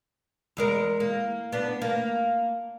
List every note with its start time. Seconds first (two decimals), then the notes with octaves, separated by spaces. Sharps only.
0.57 E2 G#3 A#4
1.00 A#3
1.52 B3 D4
1.82 A#3